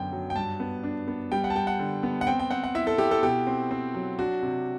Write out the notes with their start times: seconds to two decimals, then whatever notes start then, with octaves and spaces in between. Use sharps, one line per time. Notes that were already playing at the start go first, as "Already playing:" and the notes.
Already playing: F#2 D3 B3 G5
0.12 F#3
0.30 G5
0.36 G2 A5
0.60 B3
0.83 D4
1.08 B3
1.32 G3 G5
1.44 F#5
1.50 A5
1.55 G3 G5
1.67 F#5
1.79 D3
2.03 B3
2.21 F#5
2.27 C4 G5
2.39 G5
2.51 C4 F#5
2.64 F#5
2.75 E4 E5
2.87 A4
2.98 E4 G4
3.11 A4
3.23 B2 G4
3.47 C4
3.71 C4
3.95 F#3
4.19 D4 F#4
4.42 C3